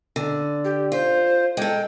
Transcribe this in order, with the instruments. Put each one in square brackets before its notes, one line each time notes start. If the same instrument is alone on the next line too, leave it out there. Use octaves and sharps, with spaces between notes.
[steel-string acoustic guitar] D3
[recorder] G4
[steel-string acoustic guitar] F4 [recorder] C5
[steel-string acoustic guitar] G#3 A4 [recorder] G5